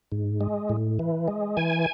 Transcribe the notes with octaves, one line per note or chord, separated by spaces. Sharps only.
G#2
G#3
A2
E3
G#3
E3 G#5